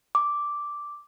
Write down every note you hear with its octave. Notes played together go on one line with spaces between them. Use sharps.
D6